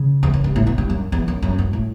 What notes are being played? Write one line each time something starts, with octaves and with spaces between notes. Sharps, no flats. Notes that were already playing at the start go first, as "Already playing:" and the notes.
Already playing: C#3
E2
F#2
G2
A2
B2
G2
F#2
E2
F#2
F#2
G2
A2